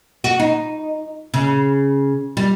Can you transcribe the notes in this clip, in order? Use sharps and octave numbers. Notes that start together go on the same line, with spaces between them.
F#4
D#4
C#3
G3